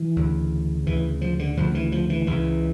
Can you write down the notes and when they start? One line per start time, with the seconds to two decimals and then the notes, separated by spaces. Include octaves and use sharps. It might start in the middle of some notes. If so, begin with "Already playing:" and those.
Already playing: E3
0.16 D2 C#3
0.86 D2 C#3 E3
1.21 F3
1.39 D3
1.57 D2 C#3 F3
1.75 E3
1.92 F3
2.10 E3
2.27 C#2 C#3 E3